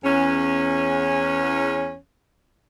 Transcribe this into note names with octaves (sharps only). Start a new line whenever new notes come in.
E2 C#4